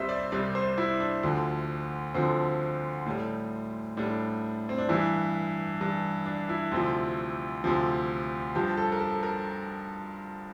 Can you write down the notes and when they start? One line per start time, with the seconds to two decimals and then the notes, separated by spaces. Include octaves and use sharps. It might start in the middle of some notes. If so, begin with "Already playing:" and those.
Already playing: C2 C3 G3 C5 E5
0.09 D5
0.32 C2 C3 G3 D5
0.55 C5
0.78 E4
1.00 D4
1.23 D2 D3 F3
2.14 D2 D3 F3 C4
3.06 A2 G3
3.97 A2 G3 D4
4.69 C4
4.78 D4
4.89 G2 E3 G3 E4
5.80 G2 E3 G3
6.26 D4
6.49 E4
6.71 D2 C3 F3
7.64 D2 C3 F3
8.55 G2 F3 G4
8.77 A4
8.92 A#4
9.00 A4
9.23 A#4